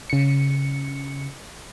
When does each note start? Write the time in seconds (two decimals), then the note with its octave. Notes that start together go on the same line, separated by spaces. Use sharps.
0.10 C#3 C#7